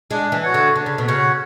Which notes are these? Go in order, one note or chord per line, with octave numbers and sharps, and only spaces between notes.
G#3 D4
E3
F#4 C#5 F#5
D3
D3 D4
C#3
B2
C#3 F#4 C#5 F#5